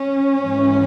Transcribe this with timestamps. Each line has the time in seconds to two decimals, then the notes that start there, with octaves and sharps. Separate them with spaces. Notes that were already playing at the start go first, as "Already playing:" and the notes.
Already playing: C#4
0.42 G#2 E3